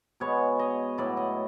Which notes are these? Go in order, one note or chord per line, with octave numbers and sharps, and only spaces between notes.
B2 G#3 B3 C#5
D#5
A2 F#3 B3 D5
D#5